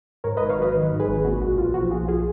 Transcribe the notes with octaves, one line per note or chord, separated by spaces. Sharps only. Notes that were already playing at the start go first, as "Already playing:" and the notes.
G#2 A#4 C#5
B4 D#5
G#1
C#5 F5
F#3 B4 D#5
D#3
G#2
G#4 B4
G#1
A#2 F#4
B1 F#4
B1 F4
F3 F#4
A#2 F4 G#4
F4 G#4